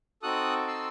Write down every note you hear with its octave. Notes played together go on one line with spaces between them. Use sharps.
C4 D#4 F#4 A4 D#6 F#6
C6 E6